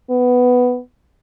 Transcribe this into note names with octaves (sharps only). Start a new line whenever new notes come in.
B3